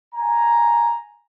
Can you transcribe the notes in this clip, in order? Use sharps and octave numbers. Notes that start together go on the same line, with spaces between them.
G#5 A#5